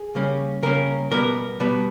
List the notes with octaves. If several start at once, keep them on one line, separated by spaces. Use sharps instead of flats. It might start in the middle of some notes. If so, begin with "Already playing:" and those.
Already playing: G#4
C#3 G3 A#3 C#4
C#3 G3 A#3 C#4 A#4
B2 G3 B3 A#4
B2 G3 B3